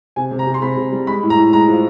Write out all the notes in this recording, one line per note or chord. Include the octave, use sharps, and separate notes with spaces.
C3 G#5
C3
A#5
C3
C6
C3 B5
C3
G3
G#3 B5
A2
A#5
A2
G#3 A#5
F3